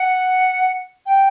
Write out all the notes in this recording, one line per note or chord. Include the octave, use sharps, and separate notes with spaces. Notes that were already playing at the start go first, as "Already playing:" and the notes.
Already playing: F#5
G5